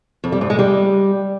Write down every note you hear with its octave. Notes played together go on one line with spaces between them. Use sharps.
F2
G3
G#2
G#3
G3